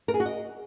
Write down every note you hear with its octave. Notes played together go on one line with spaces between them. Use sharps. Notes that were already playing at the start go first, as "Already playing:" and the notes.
A#4
G#4
F#4
D#5